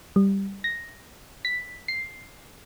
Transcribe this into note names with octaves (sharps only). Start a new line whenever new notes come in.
G3
A#6
B6
C7